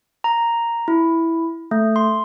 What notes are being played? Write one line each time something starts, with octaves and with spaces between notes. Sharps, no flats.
A#5
E4
A3
C6